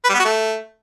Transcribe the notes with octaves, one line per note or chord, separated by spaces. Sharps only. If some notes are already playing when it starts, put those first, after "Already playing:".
B4
G3
B3
F#4
A3